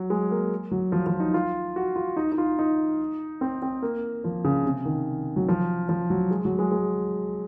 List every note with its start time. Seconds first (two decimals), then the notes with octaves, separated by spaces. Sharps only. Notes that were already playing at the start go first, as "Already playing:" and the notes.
Already playing: F#3
0.10 G#3
0.31 A#3
0.71 F#3
0.92 F3
1.06 F3
1.20 D#4
1.34 F4
1.76 F#4
1.96 F4
2.16 D#4
2.32 D#4
2.38 F4
2.59 D#4
3.41 C4
3.62 C4
3.82 A#3
4.24 F3
4.44 C#3
4.65 C3
4.85 D#3
5.36 F#3
5.49 F3
5.89 F3
6.10 F#3
6.31 G#3
6.45 F#3
6.59 G#3
6.71 G#3